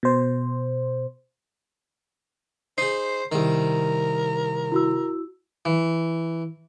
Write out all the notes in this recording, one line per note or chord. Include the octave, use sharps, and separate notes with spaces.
B2 C5
D#4 G#4 C5 C7
C2 D#3 A#4
E4 F#4 E6
E3